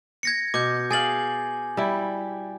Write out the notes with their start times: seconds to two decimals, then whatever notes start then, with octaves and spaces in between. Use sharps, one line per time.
0.23 G#6 A#6 C#7
0.54 B2 D6 G6
0.91 G#4 F5 G#5 A6 F#7
1.77 G3 E4